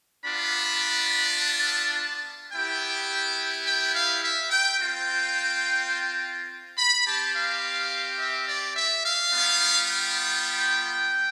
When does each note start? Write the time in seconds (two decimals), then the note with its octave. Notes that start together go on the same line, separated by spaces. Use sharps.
0.25 B3 D4 F4 B5
1.38 A5
2.52 B3 E4 G4 G5
3.65 G5
3.94 F5
4.22 E5
4.50 G5
4.79 C4 F4 G5
6.78 B5
7.05 C4 G4 A5
7.33 F5
8.19 E5
8.47 D5
8.76 E5
9.04 F5
9.32 G3 B3 F4
9.89 G5